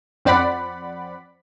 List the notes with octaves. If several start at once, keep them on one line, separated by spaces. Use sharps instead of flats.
F2 C4 D5 F#5 B5